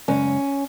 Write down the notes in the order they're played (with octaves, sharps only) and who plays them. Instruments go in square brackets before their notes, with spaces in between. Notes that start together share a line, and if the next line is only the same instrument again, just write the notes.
[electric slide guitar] F#2 C#3 G#3 [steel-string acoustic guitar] C#4